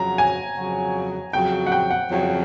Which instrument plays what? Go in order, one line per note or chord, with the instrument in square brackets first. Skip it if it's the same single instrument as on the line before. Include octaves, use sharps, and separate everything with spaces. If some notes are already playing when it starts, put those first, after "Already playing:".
Already playing: [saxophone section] F2 C#3 F#3 [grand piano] A#5
[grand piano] G#5
[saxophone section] F2 C#3 F#3
[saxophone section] F2 C#3 F#3 [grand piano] G5
[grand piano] F#5
G5
F#5
[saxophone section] F2 C#3 F#3